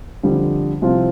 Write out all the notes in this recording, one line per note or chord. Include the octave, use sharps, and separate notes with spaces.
F2 D3 G3
C2 C3 F3 C4 F4